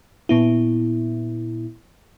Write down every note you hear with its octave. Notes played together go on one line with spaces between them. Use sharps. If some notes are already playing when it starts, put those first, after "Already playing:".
A#2 B3 E4